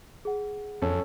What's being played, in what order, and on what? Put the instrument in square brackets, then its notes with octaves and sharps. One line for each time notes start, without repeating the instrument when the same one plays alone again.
[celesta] G#4 F#5
[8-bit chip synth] F2 [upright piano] C#4 A4